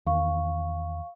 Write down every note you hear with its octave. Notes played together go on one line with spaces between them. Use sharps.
E2 D#3 F5 C#6